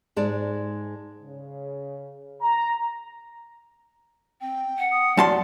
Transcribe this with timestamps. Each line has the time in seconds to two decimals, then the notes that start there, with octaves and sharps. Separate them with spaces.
0.16 G#2 G#3 D5 A5
1.22 C#3
2.41 A#5
4.41 C4 G5
4.78 F#5
4.91 D#6
5.17 F#2 D5 A5 C6